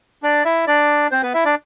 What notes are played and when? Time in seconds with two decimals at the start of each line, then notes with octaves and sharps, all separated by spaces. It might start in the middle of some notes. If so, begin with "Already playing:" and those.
0.23 D4 D5
0.45 E4 E5
0.67 D4 D5
1.11 C4 C5
1.23 B3 B4
1.34 E4 E5
1.45 D4 D5